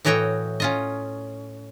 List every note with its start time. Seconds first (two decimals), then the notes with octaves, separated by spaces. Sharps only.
0.05 A2 E3 F#4 C#5 D#5 G5
0.60 C#4 F4 D#5